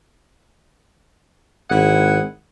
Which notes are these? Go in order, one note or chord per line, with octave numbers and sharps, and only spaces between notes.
G#1 E4 G#4 F#5